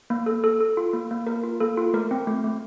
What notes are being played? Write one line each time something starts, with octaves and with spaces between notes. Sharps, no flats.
A#3
A4
A4
A4
F4
A#3
A#3
A#3 A#4
F4
A#3 A4
F4
A3 A#4
C4
A3
A3